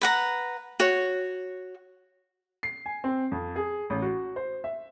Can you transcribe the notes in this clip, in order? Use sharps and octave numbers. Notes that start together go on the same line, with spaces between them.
B4 F#5 A#5
F#4 C#5
C7
G#5
C4
F2
G#4
A1
F#4
C5
E5